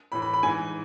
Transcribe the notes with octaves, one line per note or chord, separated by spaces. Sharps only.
A2 E3 B5
B5
B5
G#2 E3 G#5